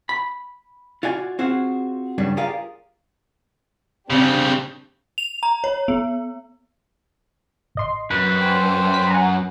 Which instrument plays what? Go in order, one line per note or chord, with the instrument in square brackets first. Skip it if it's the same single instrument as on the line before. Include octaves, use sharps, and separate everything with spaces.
[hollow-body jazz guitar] B5
F4 F#4 D5 G#5
C4 F4 F#4 G#4 C5
G2 C#3 G3 D4
F4 G4 G#4 A#4 D5 F5
[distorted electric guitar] C#3 G3 [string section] C4 D4 G4
[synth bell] F7
A#5
C#5
B3
[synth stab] A1 D#5 C6
[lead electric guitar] F#2 [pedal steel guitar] B4
[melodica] C5 G5
[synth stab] B5 B6
F#5 G#5 A#5